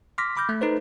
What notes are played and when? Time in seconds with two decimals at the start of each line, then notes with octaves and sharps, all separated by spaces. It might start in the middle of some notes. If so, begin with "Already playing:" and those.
0.18 C6 D6 F6 A#6 B6
0.37 B5 D6 F6 G6 A#6
0.49 A3
0.61 D#4 A4 B4 C5